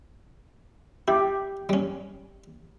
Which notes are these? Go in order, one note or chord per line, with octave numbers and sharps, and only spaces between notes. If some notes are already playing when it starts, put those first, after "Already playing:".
E4 G4
G3 C#4